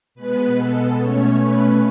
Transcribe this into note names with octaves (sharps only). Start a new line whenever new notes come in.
B2 G#3 B3 B4
A4
B2 A3 C#4 C#5
B4